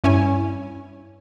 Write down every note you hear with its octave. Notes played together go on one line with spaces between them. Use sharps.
G2 C#4 E4 C#5 G#5